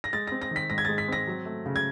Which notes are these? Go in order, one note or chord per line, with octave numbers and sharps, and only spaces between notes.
A#6
G#3 A6
C4 A#6
A#6
D#3 B6
G#2 A#6
G#6
G#3 A6
B6
C4 A#6
F#3
A3
C#3
G#6